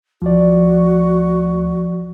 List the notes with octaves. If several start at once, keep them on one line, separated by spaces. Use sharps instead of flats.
D2 F3 F#4 D5